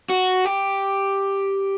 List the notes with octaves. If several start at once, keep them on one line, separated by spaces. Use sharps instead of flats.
F#4
G4